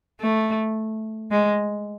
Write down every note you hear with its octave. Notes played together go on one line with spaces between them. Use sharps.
A3
G#3